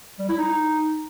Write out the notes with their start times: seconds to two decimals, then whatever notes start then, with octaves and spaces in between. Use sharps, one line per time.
0.19 G3
0.29 E4
0.38 D#4